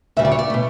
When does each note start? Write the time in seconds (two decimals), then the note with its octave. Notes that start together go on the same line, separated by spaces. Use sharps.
0.17 D2 C#3 G3 E5
0.25 D5
0.32 C#5
0.39 D5
0.50 B2 A3